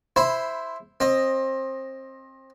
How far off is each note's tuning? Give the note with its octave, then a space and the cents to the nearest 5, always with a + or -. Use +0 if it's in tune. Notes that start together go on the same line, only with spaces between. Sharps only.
E4 +0 C5 +0 B5 +15
C4 +25 D#5 +0